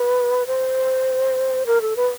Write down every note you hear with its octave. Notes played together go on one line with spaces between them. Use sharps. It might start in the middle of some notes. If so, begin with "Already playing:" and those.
Already playing: B4
C5
A#4
A4
B4